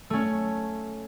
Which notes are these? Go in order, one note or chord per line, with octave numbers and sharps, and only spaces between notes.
A3 C#4